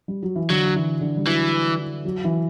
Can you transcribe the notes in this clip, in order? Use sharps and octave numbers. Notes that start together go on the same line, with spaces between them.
G3
F#3
E3
D3 F#3
E3
D3
G3
E3 F#3
F#3
E3